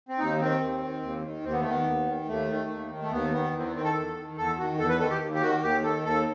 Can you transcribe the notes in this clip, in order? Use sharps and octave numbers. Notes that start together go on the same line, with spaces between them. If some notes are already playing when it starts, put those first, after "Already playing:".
C4
D#2 D#4
D#3 C4
D#2
D#3
D#2
D#3
D#2 C4
B3
A3
D#3 B3
D#2
D#3
D#2 A3
D#3
D#2
D#3
A3
D#2 B3
D#3 B3
E2
C4
B3
D#3 C4
A4
E2
D#3
E2 A4
D#3 F#4
E2 A4
B4
D#3 A4
G4
D#2
G4
D#3 F#4
D#2 G4
D#3 A4
D#2 A4